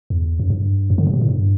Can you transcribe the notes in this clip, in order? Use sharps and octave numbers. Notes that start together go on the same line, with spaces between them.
E2
F#2
G2
F#2
D3
C3
B2
A2
G2